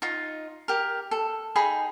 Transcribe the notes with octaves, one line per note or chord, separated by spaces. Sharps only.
D#4 F4
G4 A#4
A4
D#4 G#4 G5 B5